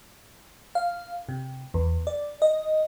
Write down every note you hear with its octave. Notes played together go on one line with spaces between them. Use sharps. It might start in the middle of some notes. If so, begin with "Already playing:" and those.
F5
C3
E2
D5
D#5